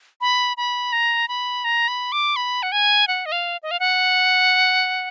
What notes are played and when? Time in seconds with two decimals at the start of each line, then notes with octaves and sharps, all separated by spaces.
0.21 B5
0.57 B5
0.93 A#5
1.28 B5
1.64 A#5
1.88 B5
2.12 D6
2.36 B5
2.63 F#5
2.72 G#5
3.08 F#5
3.26 D#5
3.32 F5
3.63 D#5
3.71 F5
3.80 F#5